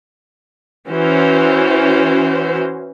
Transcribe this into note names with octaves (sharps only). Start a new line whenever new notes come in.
E3 C#4 F#4 C5